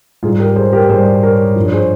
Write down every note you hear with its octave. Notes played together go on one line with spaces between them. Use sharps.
G#2 G3 F4 G#4
G4 A#4
G#4 C5
G4 A#4
G#2 G3 G#4 C5
A#4 C#5
G2 F3
C#5
G#4 C5